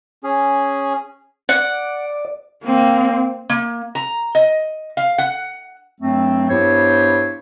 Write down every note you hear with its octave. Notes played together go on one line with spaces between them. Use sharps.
C#4 G#4
D5 F#5
A#3 C4
A#3
A#5
D#5
F5
F#5
G2 F#3 A3 C4
G2 B3 E4 G4 C5 C#5